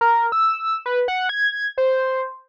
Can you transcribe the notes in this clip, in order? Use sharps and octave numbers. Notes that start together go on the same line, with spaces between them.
A#4
E6
B4
F#5
G#6
C5